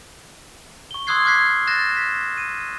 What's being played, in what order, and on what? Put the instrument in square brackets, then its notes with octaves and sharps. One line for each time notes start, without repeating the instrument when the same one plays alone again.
[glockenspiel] C#6 G7
C6 D#6 E6 F#6 G#6 C7
D6 F6 F#6 G#6 B6 C7
F#6 A6 A#6 E7
B6
D#7